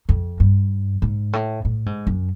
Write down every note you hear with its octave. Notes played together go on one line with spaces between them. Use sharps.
F2
G2
G#2
A2
A2
G#2
F#2